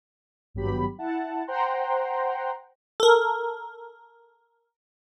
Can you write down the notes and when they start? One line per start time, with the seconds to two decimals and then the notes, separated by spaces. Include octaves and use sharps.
0.54 G#1 G2 F#3 B3 G4 B5
0.98 E4 F#5 A5
1.47 C5 F#5 G5 A#5 C6
3.00 A4 A#4